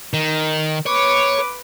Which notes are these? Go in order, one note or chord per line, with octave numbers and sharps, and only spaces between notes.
D#3
B4 C#5 D6